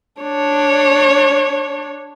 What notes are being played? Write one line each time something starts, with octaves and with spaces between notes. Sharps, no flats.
D4 C#5